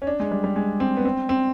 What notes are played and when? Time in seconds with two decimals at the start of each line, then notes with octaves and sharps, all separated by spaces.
0.02 C#4
0.07 D4
0.20 G#3
0.31 G3
0.44 G3
0.56 G#3
0.80 C4
0.97 B3
1.05 C4
1.29 C4